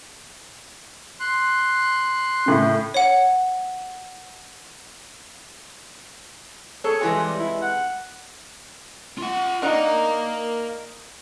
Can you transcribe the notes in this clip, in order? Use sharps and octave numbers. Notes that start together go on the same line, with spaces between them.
C6 F#6
A2 C#3
C#5 F#5
G#4 A4 C#5
C3 E3 G#3 G#5
G3
E4
F#5
F4 F#5
D4 D#4 A#4 F5 F#5